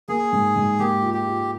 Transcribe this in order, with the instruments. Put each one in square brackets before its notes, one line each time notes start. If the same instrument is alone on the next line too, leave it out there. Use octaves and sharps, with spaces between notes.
[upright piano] A#3 [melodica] G#4
[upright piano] G#2
G#2
[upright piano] A#3 [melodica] G4
[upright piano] F4
[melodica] G4
[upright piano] F4